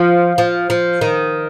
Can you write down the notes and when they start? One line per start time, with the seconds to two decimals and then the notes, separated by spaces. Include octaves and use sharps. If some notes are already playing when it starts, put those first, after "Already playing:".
Already playing: F3
0.38 F3
0.70 F3
1.01 D#3